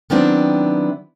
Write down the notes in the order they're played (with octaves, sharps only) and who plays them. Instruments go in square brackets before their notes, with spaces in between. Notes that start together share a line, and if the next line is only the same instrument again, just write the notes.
[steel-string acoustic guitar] D#3 F#3 B3 C4 D4 E4